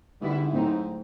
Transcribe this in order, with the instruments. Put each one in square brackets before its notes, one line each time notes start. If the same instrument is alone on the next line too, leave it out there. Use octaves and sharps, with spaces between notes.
[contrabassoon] G#2 [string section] D3 G3 B3 E4
[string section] A2 F#3 A3 C4 D#4